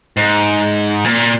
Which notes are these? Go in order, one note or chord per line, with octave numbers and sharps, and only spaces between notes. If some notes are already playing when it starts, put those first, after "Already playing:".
G#2
A#2